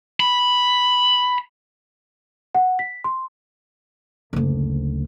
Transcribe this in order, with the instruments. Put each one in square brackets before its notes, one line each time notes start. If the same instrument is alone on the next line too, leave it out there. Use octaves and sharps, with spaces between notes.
[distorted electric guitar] B5
[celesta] F#5
B6
C6
[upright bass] F#1 D2